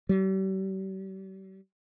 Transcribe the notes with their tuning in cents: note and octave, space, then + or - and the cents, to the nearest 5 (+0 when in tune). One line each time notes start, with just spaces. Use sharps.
G3 -40